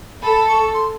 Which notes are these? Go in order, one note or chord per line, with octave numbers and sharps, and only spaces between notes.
A4 B5
C#6
C6